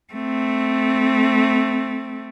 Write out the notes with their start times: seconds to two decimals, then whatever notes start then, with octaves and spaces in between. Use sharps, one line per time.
0.13 A3 C4